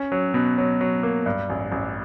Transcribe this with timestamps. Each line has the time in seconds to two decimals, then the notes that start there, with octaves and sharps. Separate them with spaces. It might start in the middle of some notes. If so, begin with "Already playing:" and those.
Already playing: C#4
0.12 F#3
0.34 B2
0.58 F#3
0.81 F#3
1.03 A#3
1.26 G2
1.49 A1
1.72 A1